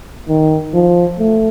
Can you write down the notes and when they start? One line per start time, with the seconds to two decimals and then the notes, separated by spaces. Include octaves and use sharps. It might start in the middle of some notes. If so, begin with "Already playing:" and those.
0.29 D#3
0.74 F3
1.19 A3